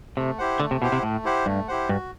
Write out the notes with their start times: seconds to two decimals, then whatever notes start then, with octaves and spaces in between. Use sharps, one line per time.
0.17 C3 A3
0.38 E4 G4 C5 F#5
0.60 D3 A3
0.71 C3
0.81 B2 E4 G4 C5 F#5
0.92 C3
1.03 A2 A3
1.24 E4 G4 C5 F#5
1.46 G2 A3
1.68 E4 G4 C5 F#5
1.89 G2 F#4